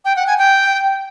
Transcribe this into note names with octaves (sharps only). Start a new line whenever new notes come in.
G5
F#5
G#5
G5